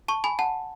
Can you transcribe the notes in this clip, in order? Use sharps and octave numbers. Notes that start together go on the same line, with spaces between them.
A5 C#6
G#5 B5
F#5 A5